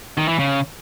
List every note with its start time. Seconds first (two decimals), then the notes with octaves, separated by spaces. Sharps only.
0.17 D#3
0.28 E3
0.39 C#3